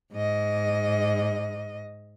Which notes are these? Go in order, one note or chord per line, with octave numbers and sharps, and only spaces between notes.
G#2 D#5